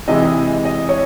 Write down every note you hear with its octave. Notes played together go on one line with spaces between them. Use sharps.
C3 E3 G#3 D#5
D#5
C#5